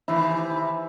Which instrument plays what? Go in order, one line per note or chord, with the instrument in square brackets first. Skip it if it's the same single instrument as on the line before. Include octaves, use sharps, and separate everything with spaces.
[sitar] C3 D#3 E3 [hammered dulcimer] E4